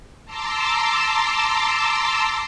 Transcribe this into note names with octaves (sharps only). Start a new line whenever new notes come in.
A5 A#5 C6 D6 E6